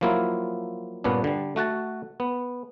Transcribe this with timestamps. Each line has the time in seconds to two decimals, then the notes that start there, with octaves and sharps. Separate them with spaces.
0.01 F3 F#3 A#3 E4 F4
1.04 G2 A#2 B3 C#4 D4
1.24 D3 G3
1.56 A3 F#4 F#5 A5
2.20 B3